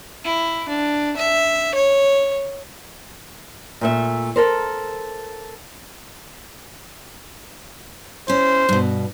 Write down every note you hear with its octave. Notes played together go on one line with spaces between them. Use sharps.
E4
D4
E5
C#5
A#2 A3 E5
A4 A#4 C5
C#4 E4 C5
G2 B2